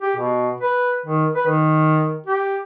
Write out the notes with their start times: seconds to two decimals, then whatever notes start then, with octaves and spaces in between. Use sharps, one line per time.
0.02 G4
0.16 B2
0.61 B4
1.06 D#3
1.35 B4
1.47 D#3
2.26 G4